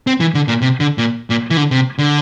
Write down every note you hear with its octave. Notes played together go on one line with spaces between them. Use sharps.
C4
E3
D3
A#2
C3
D3
A#2
A#2
E3
D3
C3
D3